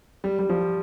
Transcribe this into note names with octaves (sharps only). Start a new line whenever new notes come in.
G3
G3
F3